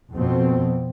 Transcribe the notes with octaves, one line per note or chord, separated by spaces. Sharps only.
F2 B2 C4